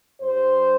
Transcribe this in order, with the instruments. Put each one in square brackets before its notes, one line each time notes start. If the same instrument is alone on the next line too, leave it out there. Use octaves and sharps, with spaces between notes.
[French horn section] G2 G3 C5